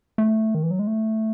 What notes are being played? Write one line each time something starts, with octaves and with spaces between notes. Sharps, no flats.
A3
D#3
E3
F#3
G#3
A3